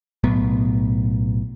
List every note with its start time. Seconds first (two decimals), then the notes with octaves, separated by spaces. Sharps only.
0.24 B1 A2 B3